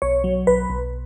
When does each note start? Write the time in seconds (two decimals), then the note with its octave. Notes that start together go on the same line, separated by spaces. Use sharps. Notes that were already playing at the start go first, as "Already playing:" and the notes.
0.02 B1 C#5
0.24 F#3
0.47 B1 B4
0.70 B1